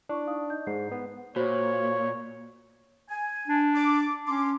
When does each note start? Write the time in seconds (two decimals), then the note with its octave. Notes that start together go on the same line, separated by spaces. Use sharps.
0.09 D4 E4 C#6 D6
0.27 D#4 F5 D#6
0.50 D#4 D#5 G6
0.67 G#2 C7
0.91 B3
1.36 A#2 F#4 C5 C#5
3.09 G#5
3.48 D4
3.76 D6
4.28 C#4 C6 D6